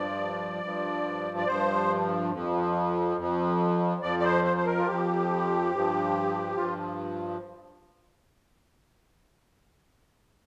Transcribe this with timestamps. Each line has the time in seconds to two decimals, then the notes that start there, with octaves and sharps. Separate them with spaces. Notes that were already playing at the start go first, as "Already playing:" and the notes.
Already playing: G2 F3 D5
0.63 G2 F3
1.37 D5
1.47 G2 F3 C5
2.32 F2 F3
3.17 F2 F3
4.02 F2 F3 D5
4.19 D5
4.24 C5
4.44 C5
4.57 C5
4.66 A#4
4.78 F4
4.87 F2 F3 G4
5.71 G2 F3
6.56 G2 F3 F4